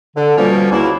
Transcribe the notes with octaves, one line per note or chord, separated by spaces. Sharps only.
D3
B2 F3 G3 A#3 C#4
C#2 F#3 A#3 E4